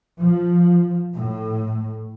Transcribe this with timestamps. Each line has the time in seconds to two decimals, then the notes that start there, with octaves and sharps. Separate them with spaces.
0.20 F3
1.14 A2